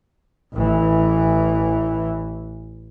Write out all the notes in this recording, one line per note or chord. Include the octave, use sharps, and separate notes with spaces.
A1 E3